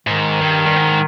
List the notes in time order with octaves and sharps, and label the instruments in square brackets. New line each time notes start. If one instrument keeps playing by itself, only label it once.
[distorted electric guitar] G#2 [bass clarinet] D#3
[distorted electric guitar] G2
G2
G#2